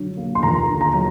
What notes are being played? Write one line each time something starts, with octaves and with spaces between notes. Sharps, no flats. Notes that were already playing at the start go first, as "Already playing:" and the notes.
Already playing: D3 F#3
A#3
C6
D#2 A#5
D3
A#5
F#3 A#5